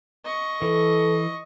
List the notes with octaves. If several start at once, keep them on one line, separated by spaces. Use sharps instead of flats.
D#5 C#6
E3 A4